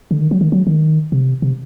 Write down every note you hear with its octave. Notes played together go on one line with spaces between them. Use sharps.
D3
D#3
F#3
D#3
F#3
D#3
C3
C3